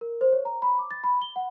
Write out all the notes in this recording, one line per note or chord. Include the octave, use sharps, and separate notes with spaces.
A#4
C5
C#5
A#5
B5
D6
A6
B5
G7
F#5